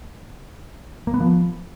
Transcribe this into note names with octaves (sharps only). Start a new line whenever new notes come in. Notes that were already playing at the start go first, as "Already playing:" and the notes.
A#3
B3
F3